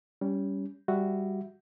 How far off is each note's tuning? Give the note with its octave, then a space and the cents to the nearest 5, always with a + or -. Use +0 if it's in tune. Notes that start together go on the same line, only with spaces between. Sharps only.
G3 +0 C#4 +20
G3 +10 F#4 +0 E5 +0